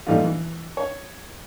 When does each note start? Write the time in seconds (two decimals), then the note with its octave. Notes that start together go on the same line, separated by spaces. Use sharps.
0.07 A#2 E3 G3 A3 D#4 F4
0.24 E3
0.77 C#5